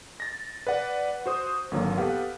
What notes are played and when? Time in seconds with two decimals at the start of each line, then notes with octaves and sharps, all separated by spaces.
0.20 A6 A#6
0.67 B4 D5 F#5
1.26 F#4 C5 D#6
1.71 G#1 D3 F#3 A#3
1.98 B3 G4 A4 B4 F5 F#5